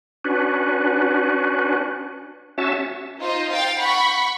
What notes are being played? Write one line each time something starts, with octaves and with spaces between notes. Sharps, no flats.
C#4 D4 F#4 B4
C#4 F#4 E5 A5
D#4 F4 C5 D#5
F5 G5 A6
F#5 B5 C#6